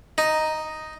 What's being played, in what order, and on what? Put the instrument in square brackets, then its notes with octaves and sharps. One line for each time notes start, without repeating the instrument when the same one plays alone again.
[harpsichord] D#4